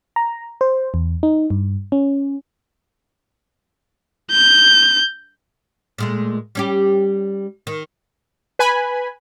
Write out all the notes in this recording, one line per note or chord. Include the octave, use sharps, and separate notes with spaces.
A#5
C5
E2
D#4
G2
C#4
G6
A#2 G#3 A3
G3 C#4 G4
D#3
B4 G#5 B5